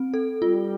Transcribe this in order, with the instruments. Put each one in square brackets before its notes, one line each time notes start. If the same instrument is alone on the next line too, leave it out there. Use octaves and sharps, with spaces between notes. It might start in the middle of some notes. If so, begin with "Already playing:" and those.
Already playing: [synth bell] C4
A4
[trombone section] G3 [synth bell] F4